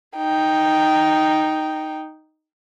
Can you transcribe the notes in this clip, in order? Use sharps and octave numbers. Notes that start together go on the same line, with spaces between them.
D#4 G5